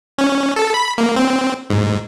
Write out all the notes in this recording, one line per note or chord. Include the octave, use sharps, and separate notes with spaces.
C#4
A4
B5
A#3
C4
G#2